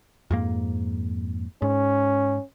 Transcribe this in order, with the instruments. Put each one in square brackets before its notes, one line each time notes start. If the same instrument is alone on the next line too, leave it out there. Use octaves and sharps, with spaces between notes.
[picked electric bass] F2 G#2 A#3
[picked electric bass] G#2 [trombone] C#4